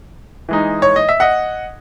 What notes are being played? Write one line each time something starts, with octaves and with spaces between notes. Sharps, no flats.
E3 G#3 D#4
C#5
D#5
E5
D#5 F#5